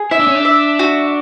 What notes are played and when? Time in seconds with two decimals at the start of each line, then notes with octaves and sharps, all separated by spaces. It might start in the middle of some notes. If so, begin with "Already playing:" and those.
Already playing: G#4
0.11 E4 E5
0.19 D4
0.27 C#4
0.35 D4
0.45 E5
0.79 F#4